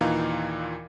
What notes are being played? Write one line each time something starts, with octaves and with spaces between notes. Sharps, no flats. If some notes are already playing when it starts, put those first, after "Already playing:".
D#2 A#2 E3 D#4 F5 A#5